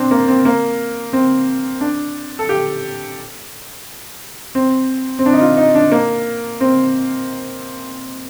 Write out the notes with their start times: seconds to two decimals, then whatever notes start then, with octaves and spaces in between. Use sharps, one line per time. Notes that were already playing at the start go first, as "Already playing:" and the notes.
Already playing: C4 D4
0.11 A#3
0.28 C4
0.45 A#3
1.13 C4
1.81 D4
2.39 A4
2.49 G4
4.55 C4
5.19 C4
5.26 D4
5.33 D#4
5.41 F4
5.57 D#4
5.75 D4
5.91 A#3
6.60 C4